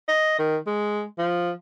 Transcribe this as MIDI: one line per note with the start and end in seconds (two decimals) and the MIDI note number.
0.08 0.35 75
0.39 0.57 51
0.67 1.04 56
1.18 1.51 53